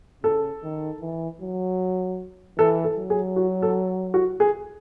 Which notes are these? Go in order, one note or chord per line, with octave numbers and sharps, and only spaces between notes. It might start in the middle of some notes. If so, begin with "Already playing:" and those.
C#3 A4
D#3
E3
F#3
E3 A4
A4
F#3
G#4
F#4
A4
F#4
G#4